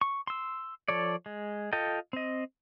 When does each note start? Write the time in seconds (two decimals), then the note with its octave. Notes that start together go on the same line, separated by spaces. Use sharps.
0.01 C#6
0.27 C6 E6
0.88 F3 A4 C#5 D5
1.26 G#3
1.73 F4 A4 D#5 G5
2.13 C4 D#5